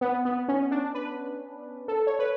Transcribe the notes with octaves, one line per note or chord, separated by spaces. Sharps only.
B3
B3
C#4
D4
B4
A4
C#5
B4